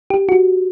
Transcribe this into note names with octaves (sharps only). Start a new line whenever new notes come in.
G4
F#4